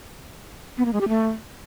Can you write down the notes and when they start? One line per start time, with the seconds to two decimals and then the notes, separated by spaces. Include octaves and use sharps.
0.78 B3
0.85 A#3
0.93 G#3
1.01 G4
1.08 A3